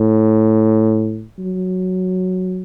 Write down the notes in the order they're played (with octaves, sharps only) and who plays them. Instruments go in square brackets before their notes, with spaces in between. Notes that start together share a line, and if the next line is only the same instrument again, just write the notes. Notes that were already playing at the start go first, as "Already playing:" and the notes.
Already playing: [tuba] A2
F#3